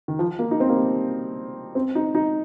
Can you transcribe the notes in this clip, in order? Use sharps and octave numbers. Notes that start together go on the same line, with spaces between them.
D#3
F3
A#3
D#4
C4
A#3
G3
C4
D#4
D#4